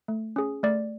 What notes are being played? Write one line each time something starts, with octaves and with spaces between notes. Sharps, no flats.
A3
C#4 G#4
A3 D5